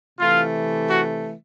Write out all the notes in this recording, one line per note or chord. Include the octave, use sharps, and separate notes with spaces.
C3 E3 A3 F4
F#4